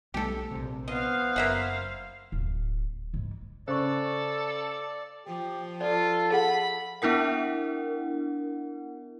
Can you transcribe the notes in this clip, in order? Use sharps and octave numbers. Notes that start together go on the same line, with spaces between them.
B1 G3 A3 G4 A4
A#1 C3
B3 C5 D#5 F5
F#1 A#3 E5 F#5
D1
G#2
C#3 A4 C5 D5 B5 C#6
F3 G4
F4 A4 D5
G#4 F#5 B5
B3 D4 E4 A#4 F#5